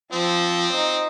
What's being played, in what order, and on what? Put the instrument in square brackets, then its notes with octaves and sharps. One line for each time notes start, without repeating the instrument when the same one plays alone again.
[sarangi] F3 [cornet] C4
[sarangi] D#4